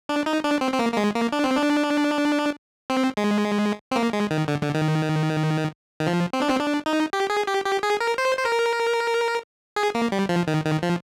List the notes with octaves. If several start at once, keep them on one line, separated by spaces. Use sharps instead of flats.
D4
D#4
D4
C4
C4
A#3
A#3
G#3
A#3
D4
C4
D4
C4
G#3
C4
A#3
G#3
D#3
D3
D3
D#3
D#3
F3
C4
D4
C4
D4
D#4
G4
G#4
G4
G4
G#4
A#4
C5
C5
A#4
G#4
A#3
G3
F3
D#3
D#3
F3